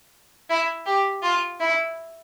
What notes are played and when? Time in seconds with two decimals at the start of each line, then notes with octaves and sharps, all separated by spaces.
0.50 E4
0.86 G4
1.22 F4
1.60 E4